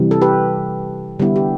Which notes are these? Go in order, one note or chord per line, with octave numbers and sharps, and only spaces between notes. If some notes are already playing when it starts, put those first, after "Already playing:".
Already playing: C3 E3 G3
A4
G4 B4
D3 G3 B3 E4
G4